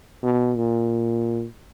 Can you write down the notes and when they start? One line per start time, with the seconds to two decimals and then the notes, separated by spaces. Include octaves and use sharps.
0.23 B2
0.56 A#2